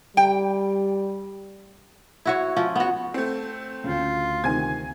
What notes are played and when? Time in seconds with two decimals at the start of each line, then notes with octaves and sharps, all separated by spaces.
0.17 G3 G5
2.26 E4 F#4 C#5
2.56 F3 C#4
2.76 B3 F#4
3.14 A3 C4
3.84 D2 C#3 F4
4.44 C3 D#3 G#5 G#6